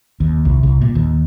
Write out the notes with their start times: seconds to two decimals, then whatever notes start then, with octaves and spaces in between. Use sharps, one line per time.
0.20 D#2
0.45 C2
0.63 C2
0.81 A#2
0.95 D#2